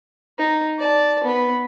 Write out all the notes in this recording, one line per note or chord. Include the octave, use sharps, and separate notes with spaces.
D#4
D5 A5
B3 B4